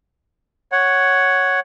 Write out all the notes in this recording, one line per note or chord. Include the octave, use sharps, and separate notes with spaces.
C#5 F#5